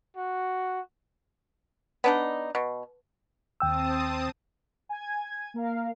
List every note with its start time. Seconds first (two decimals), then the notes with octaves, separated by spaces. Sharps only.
0.16 F#4
2.04 B3 D4 D#4
2.55 B2
3.60 D#2 C4 G5 A5 D#6 E6
4.89 G#5 G#6
5.54 A#3 A#4 F5